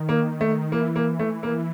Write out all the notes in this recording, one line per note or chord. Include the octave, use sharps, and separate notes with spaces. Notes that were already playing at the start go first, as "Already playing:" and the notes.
Already playing: D#3
A#3
A3
E3 A#3
A#3
A3
A#3